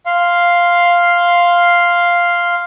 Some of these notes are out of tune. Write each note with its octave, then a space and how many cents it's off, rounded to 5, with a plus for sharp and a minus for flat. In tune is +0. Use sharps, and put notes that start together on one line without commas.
F5 +0 C6 +0